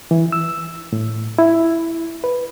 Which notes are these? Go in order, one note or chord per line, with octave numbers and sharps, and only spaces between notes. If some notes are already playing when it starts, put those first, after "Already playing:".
E3
E6
A2
E4
B4